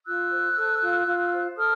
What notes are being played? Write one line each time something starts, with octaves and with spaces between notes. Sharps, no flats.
F4 E6 F#6
C5
A4
F4
F4
C5
A4 D#6 F6